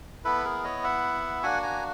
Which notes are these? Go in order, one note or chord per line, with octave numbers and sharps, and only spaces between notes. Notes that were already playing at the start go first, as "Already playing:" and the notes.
B3 E4 A4 B4
G#4 A#4
C#5 D#5
E5 F#5
A#3 D4 F#4 F#5 G#5
G#5 A#5